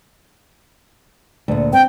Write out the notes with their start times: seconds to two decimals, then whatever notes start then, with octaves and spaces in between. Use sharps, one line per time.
1.48 D2 A#2
1.73 C4 G5